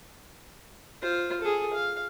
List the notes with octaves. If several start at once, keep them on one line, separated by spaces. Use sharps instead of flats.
F4 C5
G#4 A4
F5